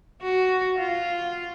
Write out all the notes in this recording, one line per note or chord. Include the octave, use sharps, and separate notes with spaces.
F#4
F4